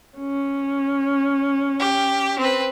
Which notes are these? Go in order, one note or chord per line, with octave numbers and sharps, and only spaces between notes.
C#4
G4
C4 B4